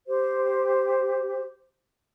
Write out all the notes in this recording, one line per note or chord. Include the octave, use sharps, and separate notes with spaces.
G4 C5